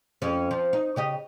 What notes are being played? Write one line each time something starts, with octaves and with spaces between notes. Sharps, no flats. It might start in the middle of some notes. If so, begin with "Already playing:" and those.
F2 C#4
F3
D#4
C#3 G4 D#5